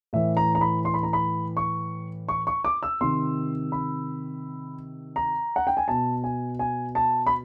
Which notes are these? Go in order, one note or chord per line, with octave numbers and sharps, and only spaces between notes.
A2 E3 E5
A#5
A#5
B5
C6
B5
A#5
B5
C#6
C#6
C#6
D6
E6
C3 D#3 C6
B5
A#5
F#5
G5
G#5
B2 A5
G#5
G#5
A5
B5